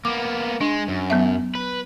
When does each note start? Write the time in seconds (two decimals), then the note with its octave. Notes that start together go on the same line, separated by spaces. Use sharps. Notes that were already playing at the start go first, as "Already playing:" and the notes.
0.05 A#3 B3 D6
0.61 G#3 D4
0.88 F#2
1.10 F#3 B3 E5
1.55 B4